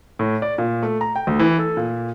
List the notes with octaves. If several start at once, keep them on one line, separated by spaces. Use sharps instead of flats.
A2
D5
A#2
A3
A#5
G5
D2
E3
A4
A#2